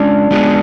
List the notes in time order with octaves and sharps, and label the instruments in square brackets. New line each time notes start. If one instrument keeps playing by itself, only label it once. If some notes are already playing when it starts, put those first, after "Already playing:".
Already playing: [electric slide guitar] G#3 C#4 F4 [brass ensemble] D4
[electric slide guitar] G#3 B3 F4 G#4